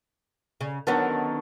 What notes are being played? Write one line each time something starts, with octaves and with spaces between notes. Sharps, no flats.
C#3
D3 D#3 F#3 B3 C#4 A4